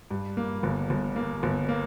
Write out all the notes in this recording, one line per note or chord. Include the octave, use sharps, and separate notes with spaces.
G2
A#3
G1
G1
A#3
G1
A#3